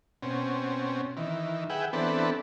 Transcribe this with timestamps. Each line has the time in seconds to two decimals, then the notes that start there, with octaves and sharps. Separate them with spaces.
0.22 B2 C4 C#4
1.17 D#3 E3
1.70 G#4 B4 E5 F#5 G5
1.93 E3 B3 C4 D4 A4 B4